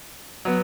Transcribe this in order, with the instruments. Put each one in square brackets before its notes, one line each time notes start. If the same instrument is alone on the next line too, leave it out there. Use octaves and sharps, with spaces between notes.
[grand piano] F#3 B3